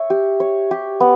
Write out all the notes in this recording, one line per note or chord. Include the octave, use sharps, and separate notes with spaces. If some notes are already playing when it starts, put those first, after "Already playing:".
Already playing: C#5 E5
G4
C#5
G4
B3